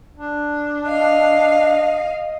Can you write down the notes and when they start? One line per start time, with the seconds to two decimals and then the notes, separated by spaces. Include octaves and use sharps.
0.15 D4
0.88 D#5 F5